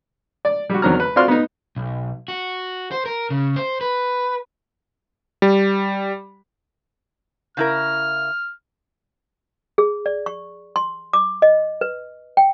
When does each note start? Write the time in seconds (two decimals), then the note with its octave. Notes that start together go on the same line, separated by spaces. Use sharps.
0.45 D5
0.70 G3 F#4
0.82 E2 D#3 F#3 C4 A#5 F6
1.00 B4
1.16 C4 F4 F#4 D5 C6 F6
1.28 B3 D#4
1.76 B1
2.28 F#4
2.91 C5
3.06 A#4
3.30 C#3
3.56 C5
3.81 B4
5.42 G3
7.57 C#3 E4 A#4 F6
9.78 G#4
10.06 D5
10.26 C#6
10.76 C6
11.13 D6
11.42 D#5
11.81 B4
12.37 G5